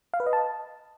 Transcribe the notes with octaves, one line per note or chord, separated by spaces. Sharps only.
F5
B4
D#5
A5